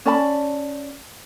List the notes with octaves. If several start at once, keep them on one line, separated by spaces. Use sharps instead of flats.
C#4 D5 A5 B5